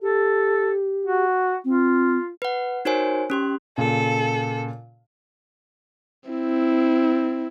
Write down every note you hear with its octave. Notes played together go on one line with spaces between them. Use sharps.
G4 A4
F#4
C4 F4
B4 F#5
D#4 F#4 A#4 C5 C#5 G#5
C#4 G4 C6
A#2 C#3 A4
C4 E4